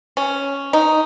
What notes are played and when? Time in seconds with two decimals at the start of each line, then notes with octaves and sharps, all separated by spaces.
0.17 C#4
0.73 D#4